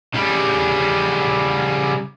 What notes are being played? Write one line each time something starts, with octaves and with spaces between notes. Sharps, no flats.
C#3 G3